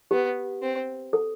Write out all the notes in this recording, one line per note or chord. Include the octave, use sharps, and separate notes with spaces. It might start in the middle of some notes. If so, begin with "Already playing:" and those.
B3 G4
C4
A4